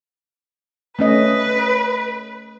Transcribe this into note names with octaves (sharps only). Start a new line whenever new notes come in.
A3 C#4 B4 D#5